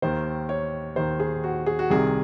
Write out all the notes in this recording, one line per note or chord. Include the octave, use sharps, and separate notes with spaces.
D#2 D#3 C5
C#5
D#2 D#3 C5
G#4
F#4
G#4
F#4
C2 C3 D#3 G#4